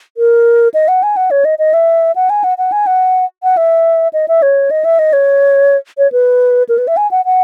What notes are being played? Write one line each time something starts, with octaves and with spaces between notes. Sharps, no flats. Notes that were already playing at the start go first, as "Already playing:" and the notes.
A#4
D#5
F#5
G#5
F#5
C#5
D#5
D#5
E5
F#5
G#5
F#5
F#5
G#5
F#5
F#5
E5
D#5
E5
C#5
D#5
E5
D#5
C#5
C#5
B4
A#4
B4
E5
G#5
F#5
F#5